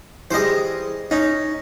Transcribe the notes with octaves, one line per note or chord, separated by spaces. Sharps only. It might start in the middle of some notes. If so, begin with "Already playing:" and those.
E3 G3 G#3 C5 D#5
C#4 D#4